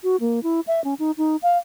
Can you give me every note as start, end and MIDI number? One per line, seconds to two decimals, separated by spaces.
0.03 0.16 66
0.20 0.42 58
0.43 0.60 64
0.67 0.83 76
0.84 0.94 61
0.99 1.11 63
1.18 1.36 63
1.43 1.58 77